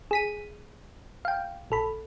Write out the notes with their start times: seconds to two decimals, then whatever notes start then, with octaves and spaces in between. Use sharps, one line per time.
0.11 G#4 B6 D#7
1.25 F5 G5
1.70 A#1 A4 B5